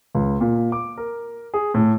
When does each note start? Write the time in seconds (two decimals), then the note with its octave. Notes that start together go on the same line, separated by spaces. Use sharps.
0.15 C#2
0.41 A#2
0.72 D6
0.98 A#4
1.54 G#4
1.74 A2